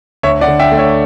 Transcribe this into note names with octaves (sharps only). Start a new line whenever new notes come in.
D2 C#5 E5
D5 F#5
D3
E5 G5
A3
C#5 E5